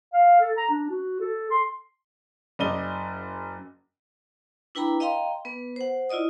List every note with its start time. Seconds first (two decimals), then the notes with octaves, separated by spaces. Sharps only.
0.13 F5
0.40 A4
0.57 A#5
0.70 D4
0.90 F#4
1.20 A4
1.50 C6
2.59 F#1 D5 D#5 D#7 G7
4.75 D4 E4 B4 G5 A#5 B5
5.00 D#5 F5 G5 A#5 C6
5.45 B3 B4
5.76 C5 F#5
6.09 E4 F4 D5 D#5 D#6